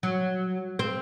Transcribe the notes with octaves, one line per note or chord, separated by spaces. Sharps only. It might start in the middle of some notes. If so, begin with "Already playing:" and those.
F#3
C4